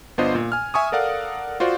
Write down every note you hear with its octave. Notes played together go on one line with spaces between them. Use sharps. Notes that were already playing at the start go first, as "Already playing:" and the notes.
G1 B3 D4 F4 C5 D#5
A#2
G#5 F6
E5 G#5 C#6 D#6
A4 A#4 D5 F5 F#5
F4 F#4 C5 D5 F5